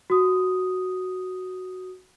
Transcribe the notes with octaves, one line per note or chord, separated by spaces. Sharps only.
F#4 D#6